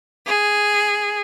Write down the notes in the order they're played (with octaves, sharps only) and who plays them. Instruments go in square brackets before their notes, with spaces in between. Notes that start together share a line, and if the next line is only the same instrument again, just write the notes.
[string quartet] G#4